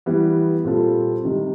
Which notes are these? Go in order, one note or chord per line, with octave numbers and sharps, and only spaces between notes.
E3 G3 B3
A#2 G3 C4 F4 A4
C3 D#3 G3